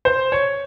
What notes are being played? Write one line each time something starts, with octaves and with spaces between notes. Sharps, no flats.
C5
C#5